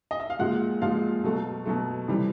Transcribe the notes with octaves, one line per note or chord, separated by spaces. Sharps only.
D#5
E5
F5
A#2 F3 G#3 F#5
A#2 F3 G#3 F5
B2 F#3 A3
B2 F#3 A3
C3 E3 G3